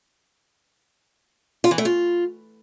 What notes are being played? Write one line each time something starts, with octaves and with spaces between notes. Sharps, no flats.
F4
E3
A3
F4